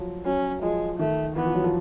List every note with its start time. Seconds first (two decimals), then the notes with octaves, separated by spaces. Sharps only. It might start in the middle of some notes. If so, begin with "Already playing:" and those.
Already playing: F3 F#3
0.25 F#3 C#4
0.62 F3 G#3
0.99 D#3 A3
1.36 E3 B3
1.46 F3
1.55 F#3
1.64 F3